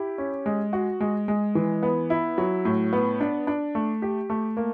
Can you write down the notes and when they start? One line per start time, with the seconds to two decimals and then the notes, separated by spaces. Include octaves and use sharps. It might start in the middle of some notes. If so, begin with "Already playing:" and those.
Already playing: E4 G4
0.18 C#4
0.46 G#3
0.73 F#4
1.00 G#3
1.28 G#3
1.55 E3
1.83 B3
2.10 E4
2.38 F#3
2.65 A2
2.93 B3
3.20 D4
3.47 D4
3.75 A3
4.02 G4
4.30 A3
4.57 A#3